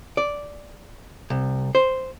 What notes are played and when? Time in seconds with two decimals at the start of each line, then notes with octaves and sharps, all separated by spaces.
0.17 D5
1.30 C2
1.75 C5